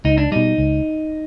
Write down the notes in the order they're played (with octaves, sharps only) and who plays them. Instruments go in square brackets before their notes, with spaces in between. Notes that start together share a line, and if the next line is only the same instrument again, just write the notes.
[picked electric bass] C#2 [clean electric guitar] D#4
[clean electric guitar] D4
[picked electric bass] B2 G3 [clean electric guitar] D#4
[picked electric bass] C#2